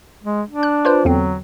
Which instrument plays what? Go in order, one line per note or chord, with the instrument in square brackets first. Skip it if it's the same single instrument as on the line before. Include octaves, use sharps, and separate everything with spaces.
[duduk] G#3
D4
[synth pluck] F#6
F4 B4 C5
[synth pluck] E2 D3 C4 [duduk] F#3